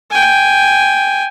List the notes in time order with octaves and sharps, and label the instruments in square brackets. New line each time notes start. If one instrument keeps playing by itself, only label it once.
[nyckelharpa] G5 G#5